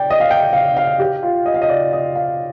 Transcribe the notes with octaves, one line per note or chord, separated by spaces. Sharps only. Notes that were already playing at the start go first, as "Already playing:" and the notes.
Already playing: D5 G5
D#5
F5
G5
F5
F5
G4
F4
D#5
F5
D#5
D5
D#5
F5